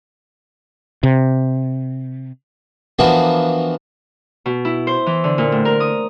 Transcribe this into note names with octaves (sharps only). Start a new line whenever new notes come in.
C3
E3 F3 A#3 B3 D4 F#4
B2
E4
C5
E3
D3
A#2
A2
A#4
D#6